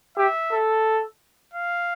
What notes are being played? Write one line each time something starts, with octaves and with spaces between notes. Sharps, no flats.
G4 E5
A4
F5